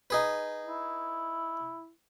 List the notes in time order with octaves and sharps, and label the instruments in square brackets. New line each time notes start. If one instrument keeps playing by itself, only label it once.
[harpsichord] D#4 G#4 B4
[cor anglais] E4